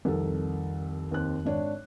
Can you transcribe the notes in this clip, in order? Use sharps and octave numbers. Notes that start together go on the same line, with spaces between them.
C2 F2 D#3 A4
D#2 C4 F#6
G#1 D4 C#5